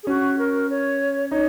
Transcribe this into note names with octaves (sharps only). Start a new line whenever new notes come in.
G#4
C#4 F#4
A#4
C#5
D#4 C#5